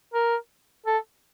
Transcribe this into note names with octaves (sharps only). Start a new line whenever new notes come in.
A#4
A4